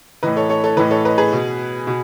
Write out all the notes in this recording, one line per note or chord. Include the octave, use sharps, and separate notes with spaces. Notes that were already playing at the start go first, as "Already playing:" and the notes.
A2 E3 B4 D#5
A4 C#5
A4 C#5
A4 C#5
A2 E3 B4 D#5
A4 C#5
B4 D#5
G#4 B4
B2
B2